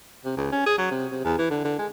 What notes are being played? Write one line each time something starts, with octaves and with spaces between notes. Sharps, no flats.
C3
C#2
C#4
G#4
F#3
C3
C3
E2
E3
D3
D3
G#3